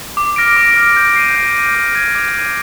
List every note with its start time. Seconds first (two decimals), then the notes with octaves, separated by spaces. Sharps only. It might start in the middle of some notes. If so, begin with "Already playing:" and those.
0.17 D6
0.36 F6 A#6 D7
0.56 D6
0.77 F6 A#6 D7
0.97 G6
1.16 C7 D#7
1.35 G6
1.56 C7 D#7
1.75 D6
1.95 G#6 D#7
2.15 D6
2.35 G#6 D#7